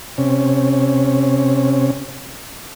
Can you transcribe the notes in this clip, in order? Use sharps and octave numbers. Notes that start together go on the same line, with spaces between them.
C3 C#4